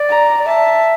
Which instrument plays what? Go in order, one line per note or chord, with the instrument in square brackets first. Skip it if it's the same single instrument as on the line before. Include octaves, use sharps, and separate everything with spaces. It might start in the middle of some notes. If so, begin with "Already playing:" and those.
Already playing: [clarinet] D5
[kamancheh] A#5
[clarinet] D5
[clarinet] E5 [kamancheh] A5